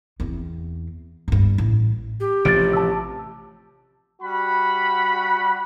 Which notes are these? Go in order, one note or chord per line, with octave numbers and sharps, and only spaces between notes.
E2 C4
G1 G2
A1
G4
A1 C3 F3 A6 D7
A5 E6
G3 F#4 F#5 B5